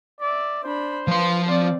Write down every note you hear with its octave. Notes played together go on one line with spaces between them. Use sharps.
D5 E5
D4 C5 B5
F3 B4 F5 C6
C4 F4 D5